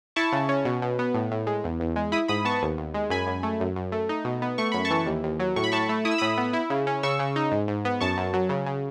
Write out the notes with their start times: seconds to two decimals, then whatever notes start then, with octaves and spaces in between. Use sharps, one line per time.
0.16 E4 A5 C#6
0.32 C#3
0.49 C#4
0.65 B2
0.82 B2
0.99 B3
1.14 A2
1.32 A2
1.47 G#3
1.64 E2
1.80 E2
1.96 G#3
2.12 E4 B5 D#6
2.28 G#2 B5 D#6
2.45 B3 A5 C#6
2.62 D#2
2.78 D#2
2.94 G#3
3.10 F#2 G#5 B5
3.27 F#2
3.43 A3
3.60 F#2
3.76 F#2
3.92 A3
4.09 D#4
4.24 B2
4.42 B3
4.58 A3 C#6
4.72 F#2 B5
4.85 A5 C#6
4.90 E3
5.06 D#2
5.24 D#2
5.40 F#3
5.56 A2 C#6
5.64 B5
5.72 A2 A5 C#6
5.89 A3
6.05 E4 D#6
6.11 E6
6.18 A2 B5 D#6
6.38 B3
6.53 E4
6.70 C#3
6.87 C#4
7.03 C#3 C#6 E6
7.19 C#3
7.36 D#4
7.52 G#2
7.68 G#2
7.85 B3
8.01 F#2 A5 C#6
8.17 F#2
8.33 F#3
8.49 C#3
8.66 C#3